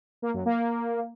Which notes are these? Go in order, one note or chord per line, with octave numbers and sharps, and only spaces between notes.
A#3
F#2
A#3